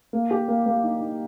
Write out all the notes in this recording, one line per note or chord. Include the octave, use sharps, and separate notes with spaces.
A#3
G4
A#3
A#3
D#4
D#4